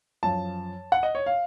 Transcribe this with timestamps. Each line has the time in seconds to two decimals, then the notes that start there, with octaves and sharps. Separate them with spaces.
0.23 F#2 F3 A5
0.92 F#5
1.03 D#5
1.15 C#5
1.26 F5